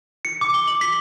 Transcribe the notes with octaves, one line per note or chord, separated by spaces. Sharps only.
C#7
D6
G7
F#7
B6